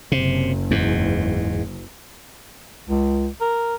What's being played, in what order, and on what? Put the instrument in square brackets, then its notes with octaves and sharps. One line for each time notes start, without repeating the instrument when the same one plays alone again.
[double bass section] F#1 [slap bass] C3
[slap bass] E2 G#2
[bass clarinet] C#2
A#4